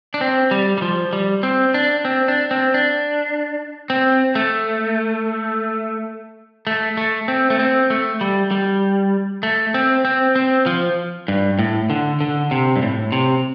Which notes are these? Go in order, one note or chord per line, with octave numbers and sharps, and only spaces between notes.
D4
C4
G3
G3
F3
G3
C4
D4
C4
D4
C4
D4
C4
A3
A3
A3
C4
A3
C4
A3
G3
G3
A3
C4
C4
C4
F3
G2
A2
D3
D3
C3
G2
A2
C3